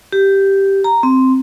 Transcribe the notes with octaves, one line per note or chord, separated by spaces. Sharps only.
G4
A#5
C4